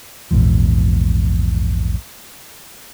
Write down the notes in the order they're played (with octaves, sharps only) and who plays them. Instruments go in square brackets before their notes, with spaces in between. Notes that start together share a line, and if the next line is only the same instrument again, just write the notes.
[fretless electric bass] A#1 E2 G#2 F3